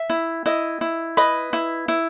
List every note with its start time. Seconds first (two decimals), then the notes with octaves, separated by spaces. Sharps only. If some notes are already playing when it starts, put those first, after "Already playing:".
Already playing: E5
0.10 E4
0.46 E4 D#5
0.81 E4
1.17 B4 D#5
1.53 E4
1.88 E4